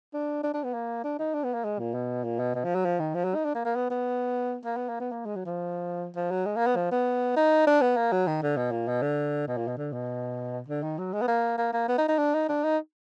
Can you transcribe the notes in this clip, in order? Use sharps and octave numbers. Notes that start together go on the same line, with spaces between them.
D4
D4
D4
B3
A#3
D4
D#4
D4
B3
A#3
G#3
A#2
B2
A#2
B2
B2
F3
F#3
F3
D#3
F3
F#3
D#4
D4
A#3
A#3
B3
B3
A#3
B3
A#3
B3
A#3
G#3
F#3
F3
F3
F#3
G#3
A#3
B3
F3
B3
D#4
D4
B3
A#3
F#3
D#3
D3
B2
A#2
B2
D3
B2
A#2
B2
D3
B2
D3
D#3
F#3
G#3
B3
A#3
A#3
A#3
B3
D#4
D#4
D4
D#4
D4
D#4